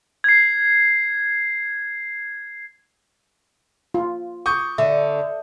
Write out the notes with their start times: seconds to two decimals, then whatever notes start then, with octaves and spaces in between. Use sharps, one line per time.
0.24 G#6 C7
3.94 F4
4.46 C#6 D#6 G6
4.78 D3 E5